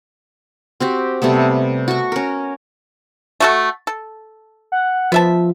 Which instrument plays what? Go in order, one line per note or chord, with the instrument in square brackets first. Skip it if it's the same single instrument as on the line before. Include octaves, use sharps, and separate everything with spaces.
[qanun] C4 F#4 G4
C3 G3 A3 B3
F#4 C#6
C#4 A#4
[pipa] A3 F#4 A4
A4
[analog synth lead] F#5
[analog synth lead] F3 [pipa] B3 E5 A5